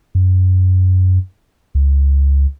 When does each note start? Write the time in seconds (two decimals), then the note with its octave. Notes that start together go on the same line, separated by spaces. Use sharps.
0.15 F#2
1.75 C#2